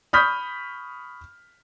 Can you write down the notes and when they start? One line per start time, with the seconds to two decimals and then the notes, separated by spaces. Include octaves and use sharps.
0.13 B5 C#6 D#6 F6 G6 B6